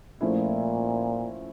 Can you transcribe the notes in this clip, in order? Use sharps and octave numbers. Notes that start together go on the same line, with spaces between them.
A#2 F3 A3 C#4 E4